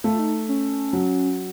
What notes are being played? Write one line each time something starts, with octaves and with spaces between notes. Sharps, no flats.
A3 F4
D#4
C#4
F#3